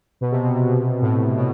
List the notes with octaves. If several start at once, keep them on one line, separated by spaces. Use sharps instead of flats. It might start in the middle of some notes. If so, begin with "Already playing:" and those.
B2
C3
B2
C3
B2
A2
B2